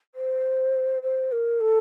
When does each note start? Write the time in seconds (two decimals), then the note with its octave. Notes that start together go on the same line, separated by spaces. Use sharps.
0.15 C5
1.03 C5
1.32 A#4
1.60 A4